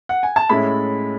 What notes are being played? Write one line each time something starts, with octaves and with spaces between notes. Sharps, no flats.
F#5
G#5
A5
A2 G#3 C#4 E4 B5